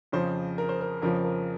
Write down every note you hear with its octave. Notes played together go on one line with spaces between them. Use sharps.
F2 C#3 F3 C5
A#4
C5
A#4
F2 C#3 F3 A#4
A#4